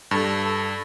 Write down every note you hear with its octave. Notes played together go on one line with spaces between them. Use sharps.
G2 A4